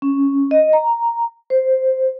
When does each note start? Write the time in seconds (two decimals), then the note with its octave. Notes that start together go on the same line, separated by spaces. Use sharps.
0.02 C#4
0.51 D#5
0.73 A#5
1.50 C5